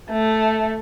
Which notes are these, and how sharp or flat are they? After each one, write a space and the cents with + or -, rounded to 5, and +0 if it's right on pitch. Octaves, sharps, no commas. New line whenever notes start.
A3 +0